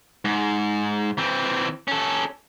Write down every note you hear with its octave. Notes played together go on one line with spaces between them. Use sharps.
G#2
E3 C4
C#4 A4